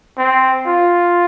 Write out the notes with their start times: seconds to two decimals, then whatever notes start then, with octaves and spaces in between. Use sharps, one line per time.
0.18 C4
0.67 F4